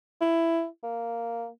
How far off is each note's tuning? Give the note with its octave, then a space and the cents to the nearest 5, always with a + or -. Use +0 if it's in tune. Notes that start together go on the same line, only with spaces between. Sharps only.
E4 +10
A#3 -5